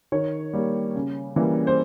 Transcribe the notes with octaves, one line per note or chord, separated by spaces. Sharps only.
D#3 C#5
G3 A#3
C#3
E3 G3 A#3 C#4
C5